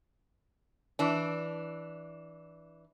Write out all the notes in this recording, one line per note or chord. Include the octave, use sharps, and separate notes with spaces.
E3 D4